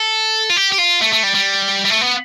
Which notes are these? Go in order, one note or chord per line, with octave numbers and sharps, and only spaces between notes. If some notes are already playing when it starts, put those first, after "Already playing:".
Already playing: A4
F4
G4
G4
F4
A3
A3
G3
G3
G3
A3
B3